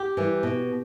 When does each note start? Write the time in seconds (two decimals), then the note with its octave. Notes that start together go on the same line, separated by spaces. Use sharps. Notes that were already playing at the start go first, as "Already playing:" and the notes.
Already playing: G4
0.17 E3 G3
0.43 B2